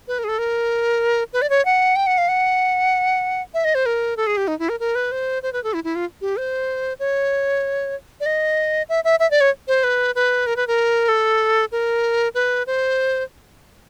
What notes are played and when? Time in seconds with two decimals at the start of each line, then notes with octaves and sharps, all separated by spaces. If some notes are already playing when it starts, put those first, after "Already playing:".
0.08 B4
0.19 A#4
0.24 G#4
0.28 A4
0.39 A#4
1.33 B4
1.42 D5
1.50 C#5
1.65 F#5
1.96 G5
2.07 F#5
2.18 F5
2.29 F#5
3.54 E5
3.65 D#5
3.75 C5
3.86 A#4
4.17 A4
4.27 G#4
4.37 G4
4.48 D#4
4.59 E4
4.69 A#4
4.80 A#4
4.95 B4
5.12 C5
5.43 C5
5.53 B4
5.64 A4
5.73 E4
5.84 E4
5.96 F4
6.21 G4
6.37 C5
6.99 C#5
8.20 D5
8.26 D#5
8.89 E5
9.04 E5
9.20 E5
9.31 D5
9.41 C#5
9.68 C5
9.84 B4
10.15 B4
10.47 A#4
10.56 B4
10.67 A#4
11.08 A4
11.72 A#4
12.35 B4
12.67 C5